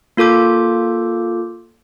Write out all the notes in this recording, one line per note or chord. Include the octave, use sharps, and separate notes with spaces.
A#3 F4 A4 D6 G6